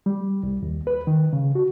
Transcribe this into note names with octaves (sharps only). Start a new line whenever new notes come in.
G3
C2
D#2
B4
D#3
C#3
F#4